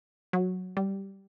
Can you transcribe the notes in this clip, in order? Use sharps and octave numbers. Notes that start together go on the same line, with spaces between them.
F#3
G3